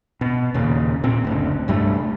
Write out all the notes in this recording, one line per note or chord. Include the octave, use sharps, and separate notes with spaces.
B2
D#2 A#2 C#3
A#2 C4
F#1 D2
C2 G2 G3 A3